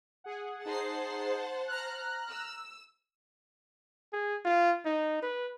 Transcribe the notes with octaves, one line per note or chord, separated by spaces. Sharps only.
G#4 F#5
D#4 G#4 C5 F#5 A5 C7
A#5 F6 F#6
E6
G#4
F4
D#4
B4